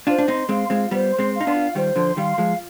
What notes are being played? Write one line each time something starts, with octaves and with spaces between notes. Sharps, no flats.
D4 F4 C5
D4
C4 D#4 C6
G#3 C4 F5
G#3 C4 F4
G3 B3 C5
C6
G#3 C4
F5
D#4
B3 D4
F4
D#3 G3 C5
D3 F3 C6
D#3 G3 F5
F3 G#3 F4